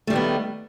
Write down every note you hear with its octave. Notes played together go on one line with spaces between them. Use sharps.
D#3 G3 A3 B3